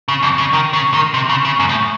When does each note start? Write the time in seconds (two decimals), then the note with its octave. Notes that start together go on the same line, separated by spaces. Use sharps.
0.08 C#3
0.23 F2
0.38 C#3
0.53 D#3
0.73 C#3
0.94 D#3
1.14 C3
1.29 C#3
1.45 C#3
1.60 F#2
1.69 A2